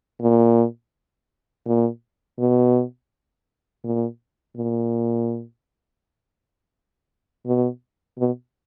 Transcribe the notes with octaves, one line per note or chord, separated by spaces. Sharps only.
A#2
A#2
B2
A#2
A#2
B2
B2